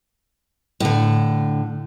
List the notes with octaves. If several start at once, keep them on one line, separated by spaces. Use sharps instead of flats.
A2 D3